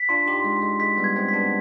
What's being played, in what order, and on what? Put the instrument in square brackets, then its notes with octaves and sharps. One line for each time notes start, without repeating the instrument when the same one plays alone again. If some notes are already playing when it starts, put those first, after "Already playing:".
Already playing: [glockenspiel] B6
[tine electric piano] D4 F4 [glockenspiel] C6
[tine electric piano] D#4 G4
[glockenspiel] C6
[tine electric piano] G#3
[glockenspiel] C6
[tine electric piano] G#3
[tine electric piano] G#3 [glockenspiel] B6
[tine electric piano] G3 B3
[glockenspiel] G#6
[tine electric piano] G#3 C4
[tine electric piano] B3 D4 [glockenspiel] B6